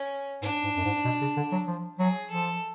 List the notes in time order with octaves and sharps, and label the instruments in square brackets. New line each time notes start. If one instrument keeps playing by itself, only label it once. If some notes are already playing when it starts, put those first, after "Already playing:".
Already playing: [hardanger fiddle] C#4
[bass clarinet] G#2 [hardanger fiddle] D4
[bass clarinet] G#2
F#2
G#2
B2
C#3
D3
F#3
F3
[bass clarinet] F#3 [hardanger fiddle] G#4
[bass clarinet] F3 [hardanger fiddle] A4